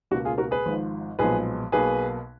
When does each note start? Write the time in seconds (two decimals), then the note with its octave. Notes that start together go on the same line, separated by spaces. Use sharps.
0.11 C#2 B2 A#3 F#4
0.25 F4 G#4
0.38 F#4 A#4
0.51 G#4 B4
0.66 G#1 G#2 F3
1.19 B1 A#2 F3 G#3 B3 G#4 B4
1.72 B1 B2 A#3 G#4 B4